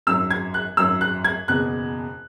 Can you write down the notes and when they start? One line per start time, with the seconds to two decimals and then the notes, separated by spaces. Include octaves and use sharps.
0.07 G#1 F#2 F#3 E6
0.31 G#6
0.54 F#6
0.77 G#1 F#2 F#3 E6
1.01 F#6
1.24 G#6
1.48 F#1 E2 B2 F#6